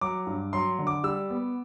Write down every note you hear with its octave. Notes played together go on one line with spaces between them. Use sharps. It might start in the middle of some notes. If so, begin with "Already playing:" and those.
F#3 D6
G2
F#3 C6
D3
D6
G3 E6
B3